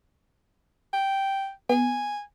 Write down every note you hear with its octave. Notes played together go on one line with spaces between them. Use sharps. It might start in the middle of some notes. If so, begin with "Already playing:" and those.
G5
B3 G#5